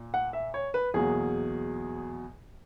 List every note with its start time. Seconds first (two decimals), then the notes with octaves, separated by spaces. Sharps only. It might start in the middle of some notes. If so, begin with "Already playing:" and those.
Already playing: A#2
0.14 F#5
0.33 E5
0.54 C#5
0.74 B4
0.94 E2 B2 F#3 A#3 G#4